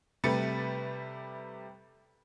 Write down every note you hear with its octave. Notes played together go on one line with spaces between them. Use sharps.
C3 G3 A3 B4 A6 C#7